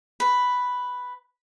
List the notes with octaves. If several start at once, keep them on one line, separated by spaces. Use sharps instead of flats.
B4